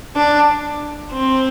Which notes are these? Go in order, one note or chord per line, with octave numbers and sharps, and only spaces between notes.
D4
C4